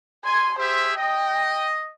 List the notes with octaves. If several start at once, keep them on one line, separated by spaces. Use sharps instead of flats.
G#5 C6
G4 G#4 C5 E5
D#5 G5